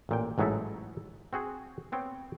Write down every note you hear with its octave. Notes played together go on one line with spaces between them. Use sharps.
A1 A#2 G5
A1 G#2 F#3 D#4 E4 A4
C4 F#4 G#4 C5
B3 C4 C#5 G5